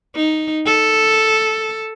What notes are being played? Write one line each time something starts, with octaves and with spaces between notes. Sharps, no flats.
D#4
A4